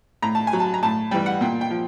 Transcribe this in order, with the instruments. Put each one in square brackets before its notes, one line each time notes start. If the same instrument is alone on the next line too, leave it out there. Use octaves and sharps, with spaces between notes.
[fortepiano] A2 A#5
A5
G#5
F#3
A5
A#5
A2 A5
E3 G3 G5
F#5
A#2 G5
G5
F3